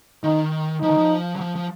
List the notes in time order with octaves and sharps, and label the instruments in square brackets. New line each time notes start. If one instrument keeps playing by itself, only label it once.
[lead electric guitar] D#3 [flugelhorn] D#4
[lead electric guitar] F3 [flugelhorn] D#4
[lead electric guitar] D#3
F3
F#3
F3
F3